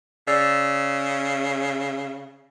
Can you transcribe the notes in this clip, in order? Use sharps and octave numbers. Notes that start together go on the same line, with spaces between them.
C#3 D5 E6